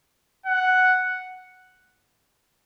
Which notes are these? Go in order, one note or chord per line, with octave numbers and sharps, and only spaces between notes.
F#5